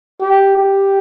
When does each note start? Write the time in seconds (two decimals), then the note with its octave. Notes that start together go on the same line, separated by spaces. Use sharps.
0.21 G4
0.57 G4